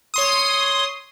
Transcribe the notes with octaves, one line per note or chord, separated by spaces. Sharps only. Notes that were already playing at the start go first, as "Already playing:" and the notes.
C#5 C6 D#6